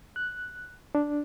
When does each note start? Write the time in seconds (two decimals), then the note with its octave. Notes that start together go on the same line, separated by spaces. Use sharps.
0.16 F#6
0.95 D4